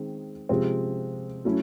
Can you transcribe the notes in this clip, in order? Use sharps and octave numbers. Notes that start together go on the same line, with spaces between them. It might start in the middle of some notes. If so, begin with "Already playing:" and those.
Already playing: D#3 G#3 C4
C3 F3 G#3 C4
F#3 A3 C#4 E4